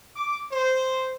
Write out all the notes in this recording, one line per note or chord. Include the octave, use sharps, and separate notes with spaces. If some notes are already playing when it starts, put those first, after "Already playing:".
D6
C5